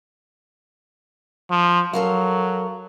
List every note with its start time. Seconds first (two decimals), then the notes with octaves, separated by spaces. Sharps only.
1.51 F3
1.93 F#3 A4 A#4 F5